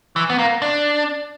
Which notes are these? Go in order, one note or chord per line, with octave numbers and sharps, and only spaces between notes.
E3
B3
A#3
D4